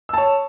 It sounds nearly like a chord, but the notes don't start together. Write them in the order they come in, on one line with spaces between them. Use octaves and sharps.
E6 A5 C#5